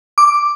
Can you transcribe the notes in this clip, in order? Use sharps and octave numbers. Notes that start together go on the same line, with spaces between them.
D6